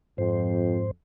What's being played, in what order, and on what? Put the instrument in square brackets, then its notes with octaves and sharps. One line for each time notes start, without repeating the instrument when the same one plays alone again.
[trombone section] F2 [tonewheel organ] G#2 C5